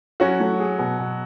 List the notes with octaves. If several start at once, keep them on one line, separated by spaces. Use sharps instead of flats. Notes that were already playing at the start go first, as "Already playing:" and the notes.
F#3 C#4 F#4
A3
G#4
B2
B2